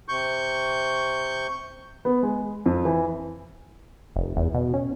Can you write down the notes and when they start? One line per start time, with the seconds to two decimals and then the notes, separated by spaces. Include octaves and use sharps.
0.09 C3 C#6 G6
2.05 B3
2.23 G#3
2.66 F2
2.85 E3
4.16 F1
4.37 E2
4.54 B2
4.74 C#4